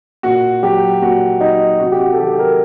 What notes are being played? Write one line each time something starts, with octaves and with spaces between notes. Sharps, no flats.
A#2 F#4
F#3 G4
A#2 F#4
F#3 D#4
C3 F#4
G4
F#4
A4
D#3 F#3 G4
A#4